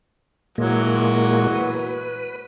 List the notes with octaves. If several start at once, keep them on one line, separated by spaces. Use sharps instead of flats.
A#2 E3 F#3 G#3 A#3 F#4
B4